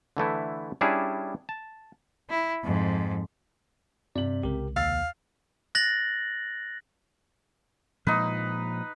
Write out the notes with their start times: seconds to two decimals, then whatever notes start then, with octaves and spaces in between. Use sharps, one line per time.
0.17 D3 E3 A3 E4
0.81 G3 C#4 D4 E4 G#4
1.49 A5
2.30 E4
2.63 F2 G#2
4.15 G2 C3 D5 F#7
4.43 C2 C#3 G#3 G4 A#4
4.76 D#2 F5 E6 A6 C7
5.75 F#6 A6 A#6 F#7
8.07 A#2 F3 G#3 D#4 B4